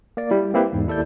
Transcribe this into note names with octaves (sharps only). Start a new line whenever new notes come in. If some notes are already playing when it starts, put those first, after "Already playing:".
A#3 D5
G3 E4
A#3 C4 E4 G4 B4
E2 G#2
D#2 E4 A4 D5 G6